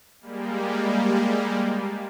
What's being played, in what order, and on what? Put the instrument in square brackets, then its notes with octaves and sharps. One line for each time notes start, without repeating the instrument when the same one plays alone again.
[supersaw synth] G3 G#3 A#3